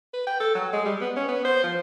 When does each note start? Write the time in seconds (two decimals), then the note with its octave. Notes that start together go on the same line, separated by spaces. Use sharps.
0.13 B4
0.27 G5
0.40 A4
0.55 F#3
0.73 G#3
0.85 G3
1.01 B3
1.16 C#4
1.28 B3
1.44 C5
1.63 F3